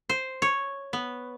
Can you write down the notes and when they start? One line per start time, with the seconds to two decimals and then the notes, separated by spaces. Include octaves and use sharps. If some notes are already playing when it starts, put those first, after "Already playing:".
0.09 C5
0.42 C#5
0.93 B3